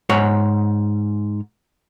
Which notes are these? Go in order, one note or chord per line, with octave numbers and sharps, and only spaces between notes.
G#2 C#5 F#5